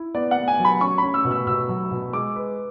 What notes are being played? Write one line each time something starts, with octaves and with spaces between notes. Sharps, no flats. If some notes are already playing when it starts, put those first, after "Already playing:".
Already playing: E4
B3 D5
F#5
B3
G#5
F#3
B5
C#4 C#6
C#4 B5
E6
B2
E6
B2 E6
F#3
B2
G#3 D6
B4